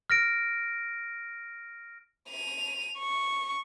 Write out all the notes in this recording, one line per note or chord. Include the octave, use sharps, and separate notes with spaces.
F6 A#6 D7
D#7 F7
C#6